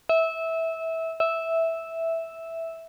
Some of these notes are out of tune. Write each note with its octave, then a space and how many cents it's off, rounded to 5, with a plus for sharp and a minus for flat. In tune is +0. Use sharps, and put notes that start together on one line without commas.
E5 -20
E5 -5